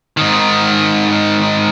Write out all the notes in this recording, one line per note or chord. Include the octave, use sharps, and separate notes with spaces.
G#2 D#3